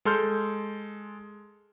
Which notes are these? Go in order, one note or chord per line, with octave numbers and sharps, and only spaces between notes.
G#3 A4 C6 F6 G6